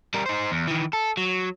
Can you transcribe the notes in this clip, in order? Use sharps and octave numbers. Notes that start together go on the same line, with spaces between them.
G3 A#4
D#4 C5
E2
D#3 E3
A4
F#3